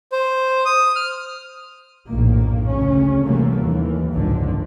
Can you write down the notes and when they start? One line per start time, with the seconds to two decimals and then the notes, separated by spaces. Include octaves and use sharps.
0.12 C5
0.65 D#6
0.96 F6
2.07 A#1 F#2 A2 D#3 A#3
2.68 D2 C#3 C#4
3.24 C3 E3 F#3 G3 A3 A#3
3.60 D#2 E3
4.13 G#1 C#2 F#2 D3 D#3 F3